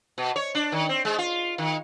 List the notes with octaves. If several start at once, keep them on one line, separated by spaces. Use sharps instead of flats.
B2
C#5
D4
D#3
C4
G#3
F4
D#3